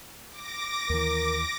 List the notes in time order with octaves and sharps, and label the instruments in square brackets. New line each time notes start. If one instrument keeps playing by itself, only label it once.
[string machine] D6 A#6
[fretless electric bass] D#2 E3 [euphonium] A#4